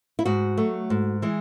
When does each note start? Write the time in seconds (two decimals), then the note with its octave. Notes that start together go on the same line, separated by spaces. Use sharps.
0.19 E4
0.25 G#2 F#4
0.57 F#3 A3
0.90 G#2
1.22 E3 G#3